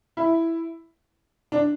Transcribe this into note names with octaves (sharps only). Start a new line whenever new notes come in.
E4
D4